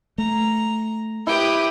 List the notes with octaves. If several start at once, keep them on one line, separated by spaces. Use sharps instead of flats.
A3 A#5
E4 G4 B4 G5 D#6